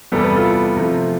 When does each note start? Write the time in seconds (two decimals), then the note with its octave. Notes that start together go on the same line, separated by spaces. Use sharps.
0.12 E2 C3 E3 G3 B3 A4
0.24 B4
0.36 F4 A4
0.77 C3 F3 A3